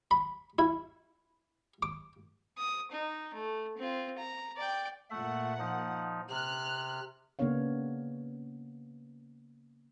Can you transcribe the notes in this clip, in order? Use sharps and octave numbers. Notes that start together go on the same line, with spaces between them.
B5
E4
D6
D#6
D#4
A3
C4 F4
A#5
D5 G5
A#2 A3 E5 F#5
F3 D#4
C3 F6 F#6
C#3 A#3 B3 D4 C#5 F5